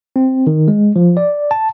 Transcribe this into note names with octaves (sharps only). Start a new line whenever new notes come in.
C4
D#3
G#3
F3
D5
A5